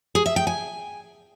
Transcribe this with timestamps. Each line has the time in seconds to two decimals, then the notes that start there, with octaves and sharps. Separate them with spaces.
0.15 G#4
0.26 E5
0.36 G5
0.47 G#5